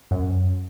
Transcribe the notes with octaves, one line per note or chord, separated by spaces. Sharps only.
F#2